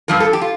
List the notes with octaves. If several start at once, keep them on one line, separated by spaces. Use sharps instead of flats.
G2 F3 A#4
A4
G4
F4